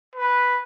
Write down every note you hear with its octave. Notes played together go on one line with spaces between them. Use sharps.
B4